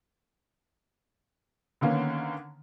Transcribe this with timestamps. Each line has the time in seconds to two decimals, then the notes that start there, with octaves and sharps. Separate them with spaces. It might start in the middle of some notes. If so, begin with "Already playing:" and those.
1.81 D3 D#3 A#3 B3 C#4